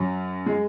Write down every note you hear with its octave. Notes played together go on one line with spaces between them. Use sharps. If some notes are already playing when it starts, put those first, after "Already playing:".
Already playing: F#2 F#3
G#3